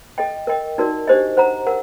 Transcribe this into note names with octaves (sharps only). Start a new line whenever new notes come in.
A4 D#5 G5
A#4 D#5 G5
D#4 F#4 A#4 D5
D4 G4 C5 D#5
C5 F#5 A#5
A#4 F#5